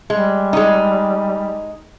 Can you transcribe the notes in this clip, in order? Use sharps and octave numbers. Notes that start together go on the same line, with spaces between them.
G3 G#3
G#3 D#4